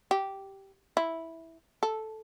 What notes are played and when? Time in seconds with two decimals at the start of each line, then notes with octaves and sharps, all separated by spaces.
0.11 G4
0.97 E4
1.83 A4